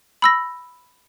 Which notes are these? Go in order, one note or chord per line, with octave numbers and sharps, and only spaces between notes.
B5 E6 A#6